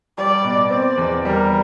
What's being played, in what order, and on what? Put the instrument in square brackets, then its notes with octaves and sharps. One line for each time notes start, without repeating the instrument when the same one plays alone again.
[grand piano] G3 [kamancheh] D5
[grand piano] B2
[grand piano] C4 [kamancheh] D5
[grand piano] E2
[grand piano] G3 [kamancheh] A#4